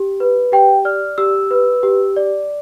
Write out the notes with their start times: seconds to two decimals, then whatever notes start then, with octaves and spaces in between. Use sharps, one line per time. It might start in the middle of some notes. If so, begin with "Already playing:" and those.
Already playing: G4
0.20 B4
0.52 G4 G5
0.85 D5 F6
1.18 G4 E6
1.51 B4
1.83 G4
2.16 D5